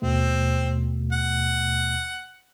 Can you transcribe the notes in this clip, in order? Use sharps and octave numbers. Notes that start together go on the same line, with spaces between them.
D#2 B2 A3 C4
F#5